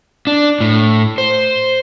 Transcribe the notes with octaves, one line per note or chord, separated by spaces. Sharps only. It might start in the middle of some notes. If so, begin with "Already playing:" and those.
D4
A2
C5